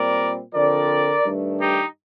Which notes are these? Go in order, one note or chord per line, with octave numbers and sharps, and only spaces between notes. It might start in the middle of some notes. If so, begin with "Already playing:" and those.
Already playing: A#2 G3 C4 A#4 D5
D3 F3 C4 A#4 D5
G2 D#3 A3 D4
D#4 G4